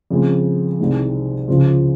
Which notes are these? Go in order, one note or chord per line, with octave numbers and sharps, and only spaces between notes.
F2 C#3 G#3
C2 C3 D#3 G#3
C#2 C#3 F3 G#3